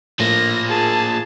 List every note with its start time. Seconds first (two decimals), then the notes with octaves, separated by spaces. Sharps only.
0.20 A2 F3 A#3 A#6
0.68 G#4 A5